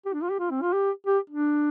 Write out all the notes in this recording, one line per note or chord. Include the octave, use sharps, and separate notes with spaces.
G4
D4
F4
G4
F4
C4
F4
G4
G4
D4